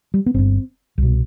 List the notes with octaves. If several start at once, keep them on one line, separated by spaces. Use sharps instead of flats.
G3
B3
G1 G2 C4
C2 B2